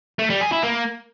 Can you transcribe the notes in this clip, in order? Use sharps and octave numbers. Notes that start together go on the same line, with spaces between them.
A3
G3
G#4
E4
A#3